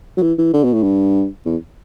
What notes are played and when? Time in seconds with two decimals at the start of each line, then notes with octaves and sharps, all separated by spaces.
0.17 F#3
0.22 E3
0.38 E3
0.54 D3
0.64 B2
0.73 A2
0.83 G2
1.46 E2